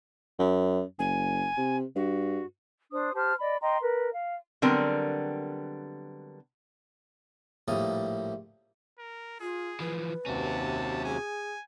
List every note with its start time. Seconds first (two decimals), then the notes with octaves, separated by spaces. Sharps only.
0.39 F#2
0.99 F#1 G#5
1.58 C3
1.96 G2 F#4
2.92 D4 C5 D#6
3.15 G4 C5 A5 F6
3.39 D5 D#5 B5
3.62 D#5 G5 A#5 C6
3.82 A#4 B4
4.11 F5
4.62 D3 F#3 G3 B3 C4 A#4
7.68 A#1 A2 G3 A#3 D#6
8.99 A#4
9.40 F4 G#4
9.80 E3 F3 B4
10.26 D#2 C3 C#4 F#4 A5
11.05 G#4 G#5